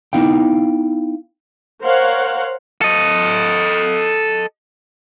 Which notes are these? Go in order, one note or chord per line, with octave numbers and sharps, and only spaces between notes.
B3 D#4 E4 F5 G5
A#4 C5 C#5 F5 F#5
A4 D#5